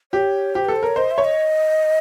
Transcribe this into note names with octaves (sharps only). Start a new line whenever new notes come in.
G4 C#5
G4 C5
A4 B4
C5
A#4 C#5
C5 D#5
E5
C#5
D#5